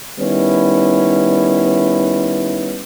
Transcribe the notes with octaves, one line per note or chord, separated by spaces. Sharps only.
D#3 G3 B3 C#4 D#4 E4